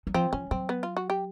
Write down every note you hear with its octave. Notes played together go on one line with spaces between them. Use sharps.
F#3
F3 C4
F3 C#4
F#3 C4
B3
F4
F#4
G4